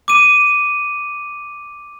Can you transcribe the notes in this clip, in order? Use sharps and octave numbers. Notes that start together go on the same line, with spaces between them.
D6 D#7